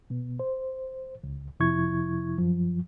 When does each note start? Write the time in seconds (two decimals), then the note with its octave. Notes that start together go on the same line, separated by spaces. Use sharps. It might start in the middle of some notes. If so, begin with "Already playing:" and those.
0.10 B2 B3
0.40 C5
1.24 C#2
1.60 F2 C3 F3 E4 C#6 G#6
2.38 F#2 F3